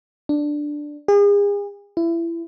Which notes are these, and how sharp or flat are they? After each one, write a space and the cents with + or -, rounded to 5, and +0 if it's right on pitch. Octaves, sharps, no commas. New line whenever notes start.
D4 +5
G#4 -40
E4 +25